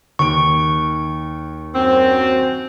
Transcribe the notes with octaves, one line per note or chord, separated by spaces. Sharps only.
D#2 C#6 D7
F#2 C4